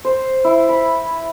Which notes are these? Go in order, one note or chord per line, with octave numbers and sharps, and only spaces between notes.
C5
E4
B5